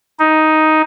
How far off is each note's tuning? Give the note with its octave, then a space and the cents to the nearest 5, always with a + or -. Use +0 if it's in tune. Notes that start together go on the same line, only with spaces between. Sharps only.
D#4 +5